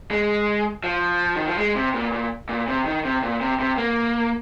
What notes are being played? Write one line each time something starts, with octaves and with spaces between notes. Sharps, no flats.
G#3
F3
D#3
F3
G#3
C3
A#2
A#2
A#2
C3
D#3
C3
A#2
C3
C3
A#3